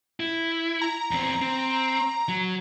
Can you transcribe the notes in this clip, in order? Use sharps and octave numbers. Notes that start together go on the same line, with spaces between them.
E4
A#5
E2 C4
C4
F#3